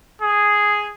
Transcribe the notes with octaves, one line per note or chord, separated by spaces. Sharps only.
G#4